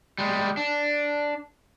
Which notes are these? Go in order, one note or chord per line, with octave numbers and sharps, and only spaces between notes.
G3 G#3
D4